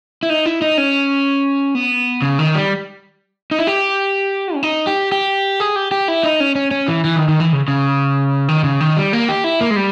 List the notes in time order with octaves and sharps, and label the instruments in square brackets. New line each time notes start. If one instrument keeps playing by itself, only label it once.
[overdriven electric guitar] E4
D#4
E4
D#4
C#4
B3
C#3
D#3
G3
D#4
E4
G4
C#4
D#4
G4
G4
G#4
G4
G4
E4
D#4
C#4
C#4
C#4
E3
E3
D#3
D#3
E3
C#3
C#3
D#3
C#3
D#3
G3
A#3
G4
E4
A#3
G#3
G3